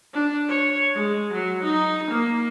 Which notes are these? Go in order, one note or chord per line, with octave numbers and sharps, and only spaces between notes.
D4
C#5
G#3
F#3
D#4
A#3